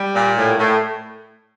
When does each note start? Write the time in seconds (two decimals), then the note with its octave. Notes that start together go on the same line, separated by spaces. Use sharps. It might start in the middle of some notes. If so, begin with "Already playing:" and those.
Already playing: G3
0.15 A#2
0.36 A2
0.58 A2